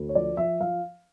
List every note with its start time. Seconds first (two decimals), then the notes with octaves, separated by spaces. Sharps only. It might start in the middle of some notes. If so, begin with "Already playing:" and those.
Already playing: D2
0.09 C#5
0.15 F3 D5
0.37 F3 E5
0.61 F3 F5